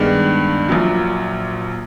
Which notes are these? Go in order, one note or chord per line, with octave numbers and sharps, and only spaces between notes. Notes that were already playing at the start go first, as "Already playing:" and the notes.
Already playing: G2 D#3 G#3 B3 D4
A#1 A#2 F#3